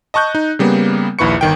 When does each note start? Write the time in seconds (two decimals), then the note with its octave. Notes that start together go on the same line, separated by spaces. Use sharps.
0.14 D#5 A5 C#6 F#6 G6
0.35 D#4
0.59 C#3 G3 A#3 B3
1.19 A#1 D#2 E4 B4 C#6 C#7
1.41 G1 D#3 G5